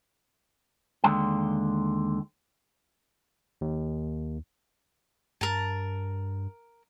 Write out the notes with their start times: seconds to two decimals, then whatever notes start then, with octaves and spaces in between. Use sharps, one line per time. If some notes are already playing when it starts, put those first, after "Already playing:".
1.04 D#2 D3 G#3 G5
3.61 D#2
5.41 G2 A#4 A5